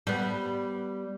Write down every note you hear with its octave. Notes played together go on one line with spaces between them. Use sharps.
G3 B3